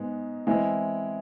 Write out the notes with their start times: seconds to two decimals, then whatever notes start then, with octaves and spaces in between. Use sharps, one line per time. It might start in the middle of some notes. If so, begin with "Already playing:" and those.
Already playing: G#2 G#3 B3
0.47 E3 G#3 C4 E4